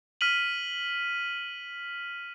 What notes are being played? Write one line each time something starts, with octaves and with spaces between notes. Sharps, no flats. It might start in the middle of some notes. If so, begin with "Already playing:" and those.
F6 B6 D#7 F#7